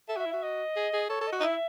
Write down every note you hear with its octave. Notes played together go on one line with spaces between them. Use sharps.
A4 E5
F#4
E5
E4
F#4 E5
D#5
G#4
G#4
A4 C#5
A4
D#5
F#4
D#4 D#5
E4 E5